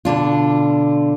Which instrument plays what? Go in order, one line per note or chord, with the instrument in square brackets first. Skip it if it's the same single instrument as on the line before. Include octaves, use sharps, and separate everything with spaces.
[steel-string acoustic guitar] B2 D3 D4 F4